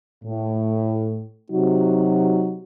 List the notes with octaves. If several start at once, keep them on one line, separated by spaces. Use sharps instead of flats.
A2
C3 F#3 D#4 F#4